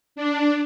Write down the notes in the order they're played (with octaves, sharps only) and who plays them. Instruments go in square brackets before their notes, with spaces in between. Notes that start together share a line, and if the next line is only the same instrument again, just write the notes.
[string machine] D4